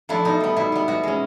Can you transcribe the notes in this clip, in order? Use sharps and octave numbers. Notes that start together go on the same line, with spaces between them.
F3 A3 D4 E4
B2 D#4
G3 B3
B2 E4
G3 B3
B2 F#4
G#3 C#4